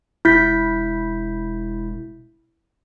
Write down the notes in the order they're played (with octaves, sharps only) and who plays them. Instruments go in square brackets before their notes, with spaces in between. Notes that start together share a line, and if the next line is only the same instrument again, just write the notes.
[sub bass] E1 [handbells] E4 G6 B6